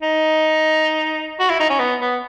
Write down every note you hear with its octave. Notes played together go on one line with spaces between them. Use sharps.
D#4
F#4
E4
D#4
C#4
B3
B3